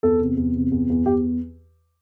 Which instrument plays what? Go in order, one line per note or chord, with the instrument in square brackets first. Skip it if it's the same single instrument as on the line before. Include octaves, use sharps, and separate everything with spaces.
[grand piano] E2 A4
C3
E2
C3
E2
E2
E2 G4